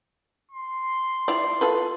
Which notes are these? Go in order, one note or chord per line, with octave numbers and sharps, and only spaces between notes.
C6
E4 F4 D5
F4 A4 B4